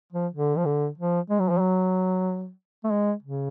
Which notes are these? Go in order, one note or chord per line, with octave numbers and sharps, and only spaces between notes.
F3
D3
F3
D3
F3
G#3
F#3
F3
F#3
A3
G#3
C#3